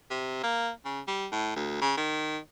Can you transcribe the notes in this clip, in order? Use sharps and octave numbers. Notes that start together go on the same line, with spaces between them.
C3
A#3
C#3
G3
A2
D2
C#3
D#3